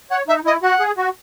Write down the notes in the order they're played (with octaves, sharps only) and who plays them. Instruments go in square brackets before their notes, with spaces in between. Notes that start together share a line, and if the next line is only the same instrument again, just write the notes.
[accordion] C#5 [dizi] F#5
[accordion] D#4 [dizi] E5
[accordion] E4 [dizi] D#5
[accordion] F#4 [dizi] F#5
[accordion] G#4
F#4